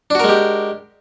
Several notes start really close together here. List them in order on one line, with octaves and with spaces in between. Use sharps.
D4 F#4 A#4 G#3 G4